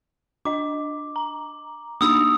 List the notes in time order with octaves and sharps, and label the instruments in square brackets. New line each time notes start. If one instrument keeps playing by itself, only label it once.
[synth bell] D4 D#5 [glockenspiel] D6
[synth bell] A#5
[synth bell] A#3 D4 D#4 [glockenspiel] D#6 E6